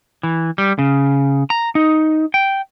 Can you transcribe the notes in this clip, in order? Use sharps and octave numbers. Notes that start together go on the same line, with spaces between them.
E3
G3
C#3
A#5
D#4
G5